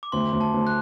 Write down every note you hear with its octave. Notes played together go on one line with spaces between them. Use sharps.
D6
D2 C6
D2
A5
D2
F#6